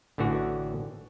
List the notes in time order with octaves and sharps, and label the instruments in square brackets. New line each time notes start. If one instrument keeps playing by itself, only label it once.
[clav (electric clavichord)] A1 D3 E3 F#4